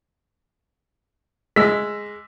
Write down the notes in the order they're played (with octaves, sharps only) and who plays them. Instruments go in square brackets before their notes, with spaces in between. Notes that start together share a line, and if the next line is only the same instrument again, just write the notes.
[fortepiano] G#3 [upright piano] E6 B6